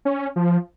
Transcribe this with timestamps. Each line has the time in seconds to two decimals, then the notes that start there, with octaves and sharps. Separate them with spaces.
0.05 C#4
0.36 F3